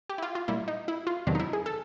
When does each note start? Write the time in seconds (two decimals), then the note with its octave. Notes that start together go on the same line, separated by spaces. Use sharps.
0.09 G4
0.18 E4
0.22 F4
0.35 F4
0.48 A#2 G3 E4
0.68 D#4
0.88 E4
1.07 F4
1.27 E2 C3 D#3 F#3 D4
1.35 D#4
1.40 E4
1.53 G#4
1.66 A4